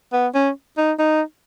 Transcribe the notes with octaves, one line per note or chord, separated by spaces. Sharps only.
B3
C#4
D#4
D#4